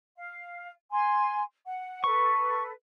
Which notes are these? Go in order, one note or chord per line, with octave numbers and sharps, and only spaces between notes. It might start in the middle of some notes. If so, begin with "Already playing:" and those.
F5
G#5 C6
F#5
A4 B4 C#6